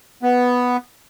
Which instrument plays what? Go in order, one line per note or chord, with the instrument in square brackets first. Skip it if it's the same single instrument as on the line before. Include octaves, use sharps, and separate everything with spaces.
[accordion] B3